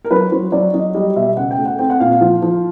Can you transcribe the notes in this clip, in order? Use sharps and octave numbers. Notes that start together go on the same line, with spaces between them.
A#4
F#3 B4
F#3 C5
F#3 D5
F#3 D#5
G3 D#5
B2 E5
C#3 F#5
G5
A3
F#5
C4 G5
F#5
A#2 F5
F5
F3
F3